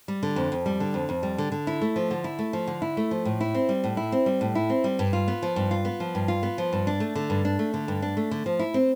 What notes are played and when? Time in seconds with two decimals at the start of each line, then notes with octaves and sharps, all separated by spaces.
0.08 G3
0.23 D3
0.36 F2
0.52 F2
0.66 G3
0.80 D3
0.94 F2
1.09 F2
1.23 G3
1.38 D3
1.52 D3
1.67 E4
1.81 A3
1.96 F3
2.11 D3
2.24 E4
2.39 A3
2.53 F3
2.67 D3
2.82 E4
2.97 A3
3.11 F3
3.25 A2
3.41 E4
3.54 C4
3.69 G3
3.84 A2
3.97 E4
4.12 C4
4.26 G3
4.41 A2
4.55 E4
4.70 C4
4.84 G3
4.99 G2
5.13 F4
5.28 B3
5.42 F3
5.56 G2
5.71 F4
5.85 B3
6.00 F3
6.15 G2
6.28 F4
6.43 B3
6.58 F3
6.73 G2
6.87 D4
7.00 A3
7.15 D3
7.30 G2
7.45 D4
7.59 A3
7.74 D3
7.88 G2
8.02 D4
8.17 A3
8.31 D3
8.46 F3
8.59 E4
8.74 C4